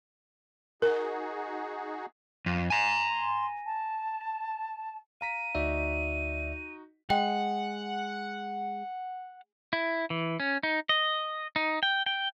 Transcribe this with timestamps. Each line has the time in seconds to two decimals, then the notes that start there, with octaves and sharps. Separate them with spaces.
0.82 D#4 F#4 G#4 A#4
2.46 F2
2.70 G#5 A#5
3.09 C6
3.65 A5
5.21 F5 A#5 B6 D#7
5.55 D2 D#4 F#4 D5 E5
7.10 G#3 F#5 G5
9.73 E4
10.10 E3
10.40 C#4
10.63 D#4
10.89 D#5
11.56 D#4
11.83 G5
12.06 G5